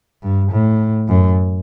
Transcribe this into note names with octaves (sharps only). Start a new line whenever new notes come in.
G2
A2
F#2